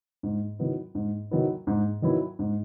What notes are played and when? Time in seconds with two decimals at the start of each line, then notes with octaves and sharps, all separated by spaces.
0.23 G#2
0.59 D#3 F#3 B3 E4
0.95 G#2
1.31 D#3 F#3 B3 E4
1.67 G#2
2.02 D#3 F#3 B3 E4
2.39 G#2